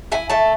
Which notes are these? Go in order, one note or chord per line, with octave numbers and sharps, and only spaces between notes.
E4 G#5
A3 A5